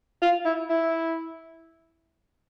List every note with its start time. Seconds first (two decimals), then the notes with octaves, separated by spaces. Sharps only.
0.22 F4
0.45 E4
0.70 E4